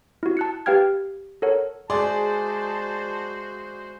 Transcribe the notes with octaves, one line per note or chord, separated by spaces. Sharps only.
E4 F#4
A5 F#6 C#7
G4 B4 F5 G5 F6 G#6
A4 A#4 C#5 F#5
G#3 F#4 G#4 C5 D5 E5 A5 C6